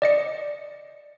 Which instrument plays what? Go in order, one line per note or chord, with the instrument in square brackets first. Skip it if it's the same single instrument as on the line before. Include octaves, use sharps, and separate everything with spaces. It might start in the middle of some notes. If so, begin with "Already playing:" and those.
[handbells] D5 D#5 C#7